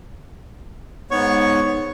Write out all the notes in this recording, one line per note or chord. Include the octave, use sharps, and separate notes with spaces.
G#2 B3 C#5 C#6